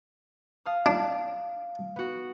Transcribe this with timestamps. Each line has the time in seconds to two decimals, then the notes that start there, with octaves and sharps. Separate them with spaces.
0.66 F5 A5 D#6
0.86 D4
1.96 B3 F#4